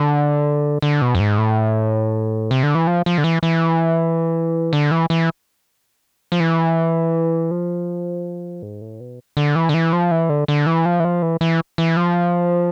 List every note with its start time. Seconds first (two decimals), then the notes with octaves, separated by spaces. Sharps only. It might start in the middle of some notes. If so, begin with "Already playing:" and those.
Already playing: D3
0.82 D3
1.02 B2
1.15 F2
1.20 G#2
1.38 A2
2.51 C3
2.63 D3
2.75 E3
2.87 F3
3.06 F3
3.18 D3
3.24 E3
3.43 E3
4.73 D3
4.91 E3
5.10 E3
6.32 F3
6.40 E3
7.51 F3
8.62 G#2
8.81 A2
9.00 B2
9.37 D3
9.55 E3
9.69 D3
9.74 E3
9.93 F3
10.11 E3
10.29 D3
10.48 D3
10.66 E3
10.85 F3
11.00 E3
11.05 F3
11.22 E3
11.41 E3
11.78 E3
11.97 F3